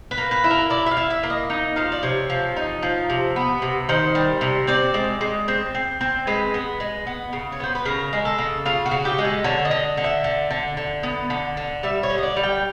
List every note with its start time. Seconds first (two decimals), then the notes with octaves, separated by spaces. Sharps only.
0.11 B4
0.18 A#3
0.31 B4
0.44 E4
0.51 A#4
0.70 E4 D5
0.86 E5
0.91 F5
0.97 E4
1.10 E5
1.23 A#3
1.30 D#5
1.50 D#4 D#5
1.76 F3 F5
1.92 D5
2.03 C3 C#5
2.30 F3
2.56 D#4
2.83 F3
3.10 C3
3.36 B3
3.62 C3
3.89 D#3 C5
4.15 G3
4.41 C3
4.67 C4 D5
4.94 G#3
5.21 G#3
5.48 C4
5.75 C4
6.01 C4
6.27 G#3 B4
6.54 B3
6.80 G#3
7.07 B3
7.33 C#3
7.52 C#5
7.60 B3 C5
7.75 B4
7.85 C#3 A#4
8.13 G#3
8.25 A4
8.38 C#3
8.66 C#3 F4
8.86 F#4
8.91 C#3
9.05 G4
9.18 G#3
9.25 A4
9.44 D3 C#5
9.65 D#5
9.71 D3
9.97 D3
10.04 E5
10.24 D3
10.51 D3
10.77 D3
11.03 B3
11.30 D3
11.57 D3
11.83 G3 E5
12.03 C#5
12.10 D3
12.18 D#5
12.23 D5
12.37 G3
12.44 G5